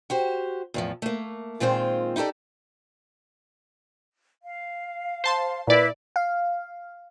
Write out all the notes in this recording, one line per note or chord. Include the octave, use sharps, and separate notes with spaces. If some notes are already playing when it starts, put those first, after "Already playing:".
F#4 G4 C5
E2 A2 F3
A3 A#3
A#2 D#3 G#3 C4 F4 C5
D#4 E4 G4 A4 D5
F5
C5 A5 C6
A#2 E4 B4 D5
F5